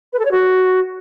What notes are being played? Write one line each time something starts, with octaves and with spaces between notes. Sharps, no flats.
B4
A4
C#5
F#4